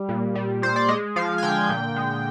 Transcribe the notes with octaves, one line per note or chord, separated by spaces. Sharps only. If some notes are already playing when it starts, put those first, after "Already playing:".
Already playing: G3
A#2
G3
A#2 C5
D5
G#3 D#5
F3 F5
G#5
D3 G5
A#2
G#3